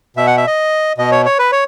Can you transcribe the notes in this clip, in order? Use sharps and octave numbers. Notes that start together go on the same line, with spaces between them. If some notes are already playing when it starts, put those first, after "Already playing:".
B2 E5
F#5
E5
D#5
B2 D#5
C#5
C#5
B4
C#5